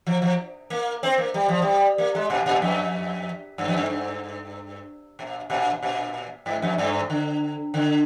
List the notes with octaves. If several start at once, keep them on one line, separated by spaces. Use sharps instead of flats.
F3
F3
A#3
C4
A#3
G3
F3
G3
A#3
G#3
A#2
A#2
F2
G2
F2
G2
G2
A#2
A#2
A#2
G#2
F2
G2
D3
D3